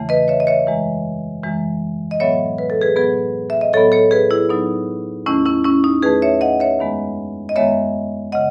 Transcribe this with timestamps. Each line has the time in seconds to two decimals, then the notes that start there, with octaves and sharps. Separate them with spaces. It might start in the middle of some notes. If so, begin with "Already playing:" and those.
Already playing: E2 C#3 E3 A3
0.09 B4 D#5
0.28 C#5 E5
0.40 D#5
0.47 C#5 E5
0.67 F#2 E3 G#3
1.43 F#2 E3 G#3
2.11 D#5
2.20 A2 F#3 B3 C#5 E5
2.58 B4
2.70 A4
2.82 G#4 B4
2.96 A2 F#3 B3 G#4 B4
3.50 E5
3.61 D#5
3.73 A2 F#3 B3 A4 C#5
3.92 A4 C#5
4.11 G#4 B4
4.31 E4 G#4
4.50 A2 F#3 B3 D#4
5.26 E2 D#3 A3 C#4 E4
5.46 C#4 E4
5.65 C#4 E4
5.84 D#4
6.03 E2 D#3 A3 G#4 B4
6.22 C#5 E5
6.41 D#5 F#5
6.60 C#5 E5
6.79 F#2 D#3 G#3 B3
7.49 D#5
7.56 F#2 D#3 G#3 B3 C#5 E5
8.32 C#3 D#5 F#5